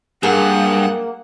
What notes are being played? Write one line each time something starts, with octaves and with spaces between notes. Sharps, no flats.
G2 A#3 G#4 F#5